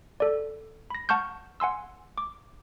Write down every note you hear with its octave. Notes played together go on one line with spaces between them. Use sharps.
A4 D5
B5 A#6
F#5 A5 C#6 F6 G6
F#5 G#5 C6 E6
D6